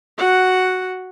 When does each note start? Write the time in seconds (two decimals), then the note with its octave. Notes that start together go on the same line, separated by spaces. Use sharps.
0.18 F#4 F#5